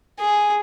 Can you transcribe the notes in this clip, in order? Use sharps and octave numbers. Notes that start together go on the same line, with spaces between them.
G#4